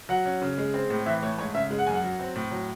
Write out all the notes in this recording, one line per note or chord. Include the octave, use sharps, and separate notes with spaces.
F#3 F#5
C#4
C#3
G#3
C4
A2
E3 E5
A3 C#5
G#2 C#5
C#3 E5
G#3
F#5
F#2 G#5
F#5
F#3
C4
A2
F#3